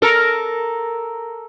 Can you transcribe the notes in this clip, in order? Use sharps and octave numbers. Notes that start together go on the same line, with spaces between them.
A4 A#4